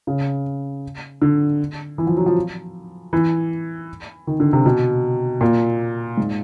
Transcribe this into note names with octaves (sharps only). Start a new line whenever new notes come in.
C#3
D3
E3
F3
F#3
F3
E3
D#3
D3
C3
B2
A#2
G#2